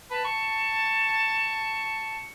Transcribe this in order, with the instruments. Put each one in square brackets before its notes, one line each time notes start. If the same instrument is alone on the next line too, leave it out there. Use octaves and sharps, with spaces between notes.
[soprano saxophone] B4 [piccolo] A5
[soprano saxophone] C#6